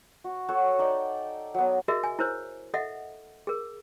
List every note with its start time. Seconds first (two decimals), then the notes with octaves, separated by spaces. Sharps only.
0.24 F#4
0.48 F#4 A4 C#5
0.79 D#4 D5 G5
1.54 F#3 B3
1.88 F#4 G#4 A#4 D#5 E5
2.04 G#5
2.19 E4 A#4 C5 C#5
2.74 A4 D#5 E5 F#5
3.47 G#4 A#4